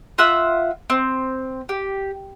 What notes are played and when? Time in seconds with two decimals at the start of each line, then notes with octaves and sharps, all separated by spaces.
0.18 F4 E5 F#5 E6
0.90 C4
1.69 G4